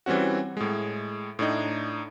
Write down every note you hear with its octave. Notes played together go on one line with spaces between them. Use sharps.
E3 G3 C4 C#4 F#4
A2 G#3
A2 D4 D#4